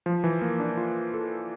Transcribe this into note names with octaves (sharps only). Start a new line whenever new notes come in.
F3
E3
A#3
D4
F4
A4